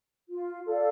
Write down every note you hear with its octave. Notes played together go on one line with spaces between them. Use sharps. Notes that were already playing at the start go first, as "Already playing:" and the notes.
F4
A4 D5 F5